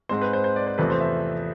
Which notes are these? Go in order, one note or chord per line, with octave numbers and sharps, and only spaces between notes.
G#2 G#3 C4 C5
B4
C5
C5
D5
C5
E2 C3 F3 A3 B4
C5
E5